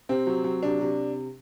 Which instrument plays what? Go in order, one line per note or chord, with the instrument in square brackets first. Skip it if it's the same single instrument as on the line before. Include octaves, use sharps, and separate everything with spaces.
[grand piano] C3 C4
F#3
F#3
C3 D4
C3